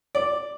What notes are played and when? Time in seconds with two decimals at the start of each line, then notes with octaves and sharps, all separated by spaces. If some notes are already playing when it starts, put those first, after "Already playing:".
0.15 D5